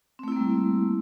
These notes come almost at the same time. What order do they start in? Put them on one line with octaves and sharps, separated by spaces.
C4 A3 E4 A#3 G3